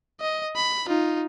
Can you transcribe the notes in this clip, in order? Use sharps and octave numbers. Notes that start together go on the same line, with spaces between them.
D#5
B5
D#4 F4